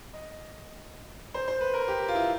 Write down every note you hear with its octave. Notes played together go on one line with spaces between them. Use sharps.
D#5
C5
C5
B4
A#4
G4
F4
E4